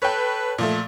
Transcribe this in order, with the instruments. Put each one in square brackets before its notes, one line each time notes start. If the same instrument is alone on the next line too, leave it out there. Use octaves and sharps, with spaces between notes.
[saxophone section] A4 B4 [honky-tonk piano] C#5 G5
[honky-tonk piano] A#2 F3 A3